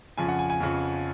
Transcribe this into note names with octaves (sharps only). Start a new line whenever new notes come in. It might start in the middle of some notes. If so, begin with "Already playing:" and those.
F2 C#3 F3 G#5
F#5
G#5
G#5
F2 C#3 F3